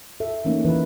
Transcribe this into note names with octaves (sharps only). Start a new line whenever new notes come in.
A4 E5
E3 A3 A#3 C#4 D#4
E3 B4